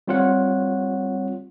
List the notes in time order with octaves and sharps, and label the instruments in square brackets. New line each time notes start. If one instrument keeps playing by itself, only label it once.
[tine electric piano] G3 C4 F4 C#5 F#5